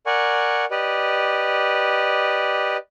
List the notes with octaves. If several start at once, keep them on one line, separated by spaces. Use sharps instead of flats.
A#4 D5 F#5 G#5 C#6
G4 B4 D5 D#5